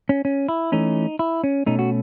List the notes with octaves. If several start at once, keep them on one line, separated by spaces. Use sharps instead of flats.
C#4
C#4
E4
E3 A3 C#4 D#4
E4
C#4
B2 A3 C#4 D#4
F#4